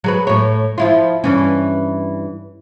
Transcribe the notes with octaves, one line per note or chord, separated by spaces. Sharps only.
F#3 G#4 B4
A2 C#5
F3 E4 F4
G2 E3 C#4